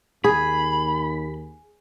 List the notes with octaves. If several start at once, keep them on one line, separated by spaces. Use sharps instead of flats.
D#2 G#4 B5